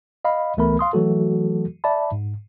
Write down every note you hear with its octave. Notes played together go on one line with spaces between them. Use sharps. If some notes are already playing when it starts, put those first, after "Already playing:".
D#5 F5 B5
C#2 E3 A3 B3 A#4 B5
F5 C6 D#6
E3 F#3 A3 F#4 A4
D5 E5 A5 B5
G#2